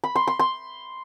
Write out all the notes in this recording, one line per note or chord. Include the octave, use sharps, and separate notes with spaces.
B5
C6
C6
C6